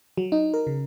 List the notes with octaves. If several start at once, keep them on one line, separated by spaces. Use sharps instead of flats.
F#3
D#4
A#4
C#3